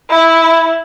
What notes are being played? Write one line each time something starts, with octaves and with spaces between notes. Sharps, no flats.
E4 B5